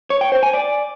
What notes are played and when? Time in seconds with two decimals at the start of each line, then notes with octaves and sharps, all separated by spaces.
0.10 C#5
0.21 G5
0.32 C5
0.43 G#5
0.53 D5